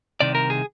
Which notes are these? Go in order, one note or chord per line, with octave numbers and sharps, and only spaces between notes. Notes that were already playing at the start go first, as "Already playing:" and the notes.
C2 C3 D#3 D5
A#4
G#4